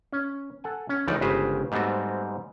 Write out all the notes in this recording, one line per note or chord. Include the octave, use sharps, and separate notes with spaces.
C#4
A4 F#5 G#5
C#4
C#2 E3 F3 A3 D#4 D5
G1 C#3 G#3 G4 B4 C5
G#2 G3 A3 B3 C4 F#4